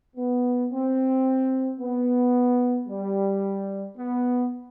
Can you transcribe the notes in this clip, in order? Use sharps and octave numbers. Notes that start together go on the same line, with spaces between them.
B3
C4
B3
G3
B3